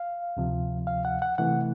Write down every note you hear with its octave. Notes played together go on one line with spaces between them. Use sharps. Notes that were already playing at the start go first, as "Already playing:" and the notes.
Already playing: F5
D2 C3 F3
F5
F#5
F#5
C3 E3 A3 F#5